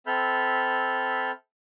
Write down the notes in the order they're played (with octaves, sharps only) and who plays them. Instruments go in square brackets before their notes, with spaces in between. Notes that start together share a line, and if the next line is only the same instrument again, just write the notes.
[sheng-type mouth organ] C4 A4 E5 B5 F6 G6